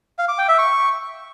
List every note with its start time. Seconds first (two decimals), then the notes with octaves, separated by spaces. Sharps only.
0.18 F5
0.28 D6
0.38 G5
0.48 E5
0.58 C#6